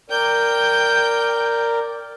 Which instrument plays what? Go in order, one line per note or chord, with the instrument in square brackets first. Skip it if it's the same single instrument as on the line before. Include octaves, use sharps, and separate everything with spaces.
[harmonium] A#4 D5 [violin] G5 G6